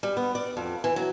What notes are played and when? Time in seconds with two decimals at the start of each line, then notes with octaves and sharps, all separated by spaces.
0.03 G3
0.17 B3
0.35 D5
0.57 F2
0.84 E3
0.96 F#3